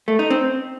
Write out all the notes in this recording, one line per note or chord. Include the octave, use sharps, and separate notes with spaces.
A3
D#4
C4